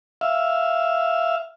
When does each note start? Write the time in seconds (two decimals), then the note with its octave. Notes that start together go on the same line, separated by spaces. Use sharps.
0.21 E5 F5